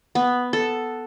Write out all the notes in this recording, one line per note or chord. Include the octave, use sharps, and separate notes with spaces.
B3
A4